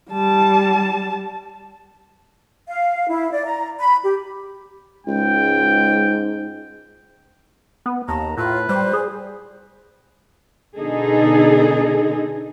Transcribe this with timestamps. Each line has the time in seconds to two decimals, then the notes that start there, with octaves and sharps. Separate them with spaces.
0.10 G3 A5
2.68 F5
3.09 E4
3.32 D5
3.45 A#5
3.79 B5
4.03 G4
5.07 C#2 G#2 G5
7.86 B3
8.08 D#2 A5 A#5
8.38 A2 F4 B4
8.69 G3 C5
8.93 G#4
10.78 B2 D3 D#4 G#4 A4